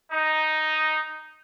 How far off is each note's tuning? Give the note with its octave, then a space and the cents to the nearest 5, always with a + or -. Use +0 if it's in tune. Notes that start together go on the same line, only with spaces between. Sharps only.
D#4 +0